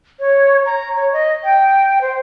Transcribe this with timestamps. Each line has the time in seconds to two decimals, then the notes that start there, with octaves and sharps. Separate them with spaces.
0.20 C#5
0.65 A#5
0.96 C#5
1.13 D#5
1.44 G5
2.01 C5